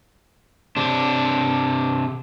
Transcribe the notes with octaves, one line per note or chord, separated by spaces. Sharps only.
C3 D4